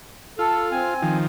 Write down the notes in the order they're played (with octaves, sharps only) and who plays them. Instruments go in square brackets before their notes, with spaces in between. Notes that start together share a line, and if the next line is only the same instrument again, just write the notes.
[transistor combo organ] F4 [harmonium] A4
[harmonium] C4 G#5
[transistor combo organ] D#3 F3